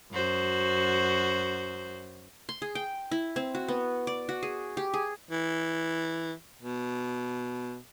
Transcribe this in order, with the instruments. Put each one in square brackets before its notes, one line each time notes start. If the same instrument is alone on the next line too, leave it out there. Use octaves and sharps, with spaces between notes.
[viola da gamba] F#2 F#4 C5
[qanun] C6
G#4
G5
E4
C4
F#4
B3
D5
F#4
G#4
G4
G#4
[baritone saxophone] E3
B2